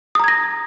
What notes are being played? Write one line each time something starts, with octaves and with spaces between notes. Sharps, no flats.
A#5 D#6 G#6 A#6